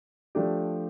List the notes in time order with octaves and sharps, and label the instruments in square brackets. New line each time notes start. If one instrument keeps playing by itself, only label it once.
[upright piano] F3 A3 D4 G4